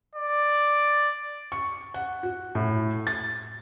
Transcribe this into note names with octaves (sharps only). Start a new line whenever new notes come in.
D5
C#6
F#5
F#4
A2
A6